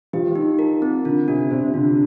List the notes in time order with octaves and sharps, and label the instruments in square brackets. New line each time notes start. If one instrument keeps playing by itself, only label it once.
[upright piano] F3 [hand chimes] G4
[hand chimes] D#4
A#4
C4
[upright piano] D3 [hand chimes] F4
[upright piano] C3 [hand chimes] D4
[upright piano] C3 [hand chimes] C5
[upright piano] D3 [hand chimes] F4